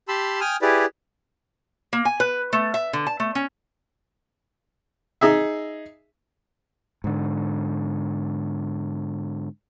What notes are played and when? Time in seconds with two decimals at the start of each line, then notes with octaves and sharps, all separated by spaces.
0.08 G4 A5 B5 C6 E6
0.41 G5 G#5 D#6 F6
0.62 E4 G4 G#4 B4 D5
1.93 A#3
2.05 G#5
2.20 B4
2.53 A3
2.74 E5
2.93 D3
3.07 A5
3.20 A3
3.35 C#4
5.21 D#4 G#4 E5
7.04 G#2 D3